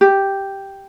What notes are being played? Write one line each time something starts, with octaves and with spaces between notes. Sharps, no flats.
G4